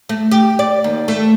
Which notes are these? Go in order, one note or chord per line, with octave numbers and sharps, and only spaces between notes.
A3
G4
D5
D#2
A3